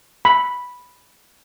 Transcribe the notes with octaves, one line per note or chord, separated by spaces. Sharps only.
B5